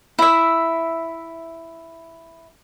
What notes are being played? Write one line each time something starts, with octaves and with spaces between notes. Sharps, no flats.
E4 E5